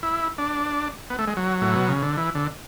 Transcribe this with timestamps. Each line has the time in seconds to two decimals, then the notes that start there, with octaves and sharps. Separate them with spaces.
0.03 E4
0.38 D4
1.10 B3
1.19 A3
1.28 G#3
1.37 F#3
1.61 A2
1.76 B2
1.88 C#3
2.02 D3
2.17 E3
2.35 D3